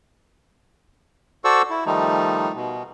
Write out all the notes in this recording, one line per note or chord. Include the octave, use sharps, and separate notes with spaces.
F#4 A4 C5 D5 C#6 E6
E4
D#3 F3 G3 A3 D#4
B2